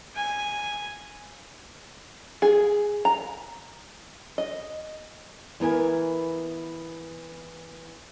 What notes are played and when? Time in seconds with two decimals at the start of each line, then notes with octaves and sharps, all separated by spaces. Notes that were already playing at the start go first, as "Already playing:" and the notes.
0.16 G#5
2.42 G#4
3.05 A#5
4.38 D#5
5.60 E3 B3 A#4 G#5